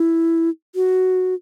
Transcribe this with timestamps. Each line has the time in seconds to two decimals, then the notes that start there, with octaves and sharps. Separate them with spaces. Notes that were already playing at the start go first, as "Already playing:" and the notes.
Already playing: E4
0.75 F#4